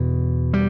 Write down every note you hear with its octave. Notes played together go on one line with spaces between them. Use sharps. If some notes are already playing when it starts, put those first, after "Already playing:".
Already playing: E2 B2
G3